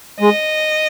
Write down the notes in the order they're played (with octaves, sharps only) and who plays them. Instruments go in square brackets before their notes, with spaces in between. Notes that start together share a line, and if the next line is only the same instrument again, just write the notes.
[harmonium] G#3 [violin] D#5